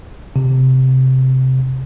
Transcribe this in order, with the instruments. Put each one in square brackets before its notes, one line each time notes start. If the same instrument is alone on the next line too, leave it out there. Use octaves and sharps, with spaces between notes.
[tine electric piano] C3